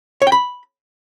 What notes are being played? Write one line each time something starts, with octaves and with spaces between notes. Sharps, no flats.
C#5
G5
B5